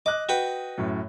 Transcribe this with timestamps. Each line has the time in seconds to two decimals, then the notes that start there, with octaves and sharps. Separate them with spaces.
0.06 D#5 D6 F#6
0.29 F#4 B4 G5
0.78 F#2 A2